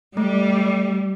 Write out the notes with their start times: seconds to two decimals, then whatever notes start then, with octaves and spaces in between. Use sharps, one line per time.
0.17 G3 A3